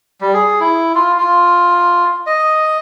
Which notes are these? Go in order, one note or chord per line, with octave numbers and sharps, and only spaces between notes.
G3
G#4
E4
F4
F4
D#5